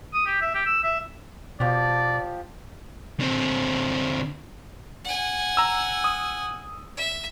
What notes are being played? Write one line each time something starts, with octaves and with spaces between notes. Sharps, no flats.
D#6
G4
E5
G4
E6
E5
B2 F3 G4 D5
D3 C4
F#5 G#5
A#5 E6
D#6
E5